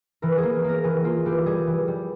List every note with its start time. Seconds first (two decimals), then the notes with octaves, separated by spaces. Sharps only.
0.22 E3 A#4
0.37 G#4
0.43 A#3
0.64 A#3 A#4
0.84 E3 G#4
1.04 A#3 F4
1.25 E3 G4
1.46 G3 G#4
1.67 E3
1.88 G3